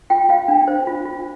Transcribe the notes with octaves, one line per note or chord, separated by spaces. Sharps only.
F4 G5
F4 F5
D4
C5
F4
F4